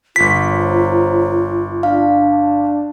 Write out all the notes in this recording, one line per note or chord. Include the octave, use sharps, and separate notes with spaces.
G1 F4 B6
A#4 C5 C#5
D4 F5